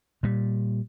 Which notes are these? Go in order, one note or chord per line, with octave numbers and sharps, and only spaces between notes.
A#2 G3